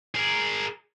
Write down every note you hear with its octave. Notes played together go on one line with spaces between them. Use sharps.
G#4 A#4